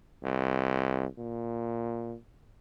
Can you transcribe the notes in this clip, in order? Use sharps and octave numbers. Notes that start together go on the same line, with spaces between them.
C2
A#2